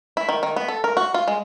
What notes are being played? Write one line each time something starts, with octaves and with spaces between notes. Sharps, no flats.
E4
D#3
D#3
B3
A4
A#4
F#4
F4
G#3